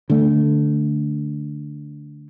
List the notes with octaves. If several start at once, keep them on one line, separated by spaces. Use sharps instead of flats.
D3 A3